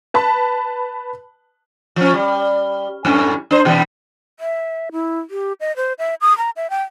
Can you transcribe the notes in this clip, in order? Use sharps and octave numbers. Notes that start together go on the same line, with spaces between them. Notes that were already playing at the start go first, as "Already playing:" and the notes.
B4 A5 B5
F3 C#4
G3
F#2 A2 C#4
D4 C5
B2 E3 G3
E5
E4
G4
D#5
C5
E5
D#6
A#5
E5
G5